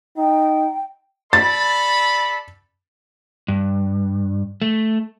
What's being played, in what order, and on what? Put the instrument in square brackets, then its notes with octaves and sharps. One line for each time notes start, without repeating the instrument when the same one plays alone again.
[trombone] D#4 [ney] G5
[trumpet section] A4 D5 B5 [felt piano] A6
[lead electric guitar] G2
A3